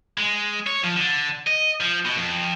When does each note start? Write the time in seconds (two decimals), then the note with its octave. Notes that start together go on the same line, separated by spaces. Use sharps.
0.18 G#3
0.67 C#5
0.84 F3
0.96 D3
1.47 D#5
1.81 F3
2.05 B2
2.17 F2